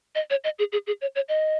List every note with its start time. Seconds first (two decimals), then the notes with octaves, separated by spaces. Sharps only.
0.15 D#5
0.30 C#5
0.44 D#5
0.59 G#4
0.72 G#4
0.87 G#4
1.01 C#5
1.15 C#5
1.29 D#5